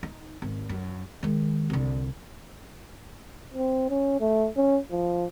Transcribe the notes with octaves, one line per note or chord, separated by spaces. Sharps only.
D#4
G#1
F#2
D#3 G#3
C2 D3
C4
C#4
A3
C#4
F3